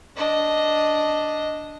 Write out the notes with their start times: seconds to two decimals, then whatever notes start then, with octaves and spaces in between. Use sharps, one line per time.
0.17 D4 D#5